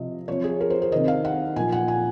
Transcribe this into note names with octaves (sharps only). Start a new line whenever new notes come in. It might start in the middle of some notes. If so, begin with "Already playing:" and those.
Already playing: C3 F3 D#5
C3 F3 C#5
G#4
A#4
C5
C5
C3 D#3 D#5
F5
F#5
A#2 F3 G#5
F#5
G#5